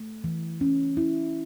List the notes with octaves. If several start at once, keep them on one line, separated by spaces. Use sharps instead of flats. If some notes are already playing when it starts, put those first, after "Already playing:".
Already playing: A3
E3
C#4
E4